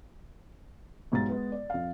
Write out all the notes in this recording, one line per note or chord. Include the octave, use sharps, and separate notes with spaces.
B1 G#2 G4 A6
G#3 B3
D5
F2 F5